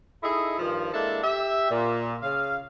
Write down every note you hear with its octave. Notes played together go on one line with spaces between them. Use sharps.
D#4 E4 G#4 A4 D#5
G2 D#3 F3
G#3 A#3 D4 E4 A4
G4 E5
A#2
C#3 F5